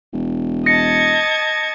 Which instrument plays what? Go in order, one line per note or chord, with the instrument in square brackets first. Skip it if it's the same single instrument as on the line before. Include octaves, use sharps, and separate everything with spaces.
[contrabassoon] E1
[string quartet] D#5 A5 G#6 [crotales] A#6 C#7